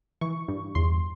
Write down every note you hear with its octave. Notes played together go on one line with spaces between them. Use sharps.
E3 C#6
G2
E2 C6